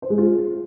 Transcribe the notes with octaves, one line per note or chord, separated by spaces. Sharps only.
C5
G#3
F4